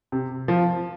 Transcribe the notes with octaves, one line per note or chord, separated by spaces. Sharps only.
C3
F3